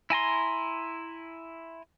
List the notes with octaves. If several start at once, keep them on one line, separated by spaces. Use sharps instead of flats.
E4 G#5 A#5 C6